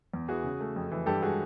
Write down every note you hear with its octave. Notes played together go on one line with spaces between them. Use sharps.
E2
E3 F#4 G#4
C#3
A3
F2
E3
G2 G4 A4
G#3 F#4 G#4